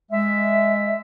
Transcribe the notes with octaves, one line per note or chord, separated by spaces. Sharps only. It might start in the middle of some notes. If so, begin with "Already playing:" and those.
G#3 E5